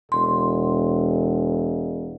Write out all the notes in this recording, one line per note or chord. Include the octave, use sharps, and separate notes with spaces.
E1 C6